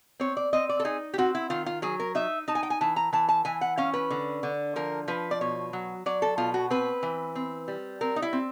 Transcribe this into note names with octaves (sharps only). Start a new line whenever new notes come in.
C4 C#5
D5
C4 D#5
D5
A4
D#4 G#4
G4
C4 F#4
E4
D#3 F4
F4
F#3 G#4
A#4
D#4 E5
D#4 A5
G#5
G5
G#5
E3 A5
A#5
E3 A5
A5
E3 G#5
F#5
C#4 F5
B4
D3
D3
F3 A#4
F3 B4
D5
B2 C#5
F#3
F#3 D5
A4
B2 F4
F#4
C4 B4
E3
C4
G3
C4 A#4
D#4
E4
C4